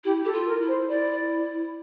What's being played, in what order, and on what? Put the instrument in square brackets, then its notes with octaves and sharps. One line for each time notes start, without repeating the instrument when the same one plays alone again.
[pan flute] E4 [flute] G4
[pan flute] G4 [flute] A4
[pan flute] F4
[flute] A#4
[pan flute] E4
[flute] C5
[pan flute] E4 [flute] D5